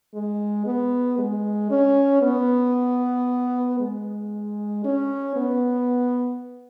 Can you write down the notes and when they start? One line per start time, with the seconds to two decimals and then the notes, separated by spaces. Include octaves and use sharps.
0.14 G#3
0.66 B3
1.18 G#3
1.70 C#4
2.22 B3
3.79 G#3
4.84 C#4
5.36 B3